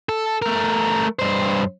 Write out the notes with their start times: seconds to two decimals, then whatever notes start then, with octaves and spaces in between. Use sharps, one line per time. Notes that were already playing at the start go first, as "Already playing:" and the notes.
0.09 A4
0.42 A3 A#4
1.19 G2 C5